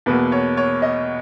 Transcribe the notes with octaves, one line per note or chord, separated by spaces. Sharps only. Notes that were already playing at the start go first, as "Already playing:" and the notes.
E2 B2 A#3 B4
C#5
C#5
D#5